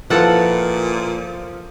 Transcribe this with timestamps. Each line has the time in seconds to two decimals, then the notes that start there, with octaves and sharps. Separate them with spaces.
0.10 A#2 F3 E4 A4 B4 F5 F#5